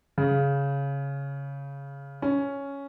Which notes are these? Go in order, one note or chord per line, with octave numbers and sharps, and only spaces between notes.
C#3
C#4